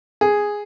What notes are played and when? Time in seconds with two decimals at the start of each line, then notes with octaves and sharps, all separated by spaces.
0.21 G#4